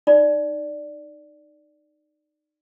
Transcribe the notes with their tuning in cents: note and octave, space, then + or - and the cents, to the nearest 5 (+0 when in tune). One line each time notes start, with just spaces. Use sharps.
D#4 -20 D5 +0